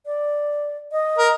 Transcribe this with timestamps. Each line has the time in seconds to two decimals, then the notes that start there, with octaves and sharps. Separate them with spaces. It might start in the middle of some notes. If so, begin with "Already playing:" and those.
0.06 D5
0.92 D#5
1.18 A#4